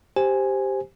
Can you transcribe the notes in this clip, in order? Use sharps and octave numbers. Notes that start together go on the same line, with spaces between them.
G4 C5 G#5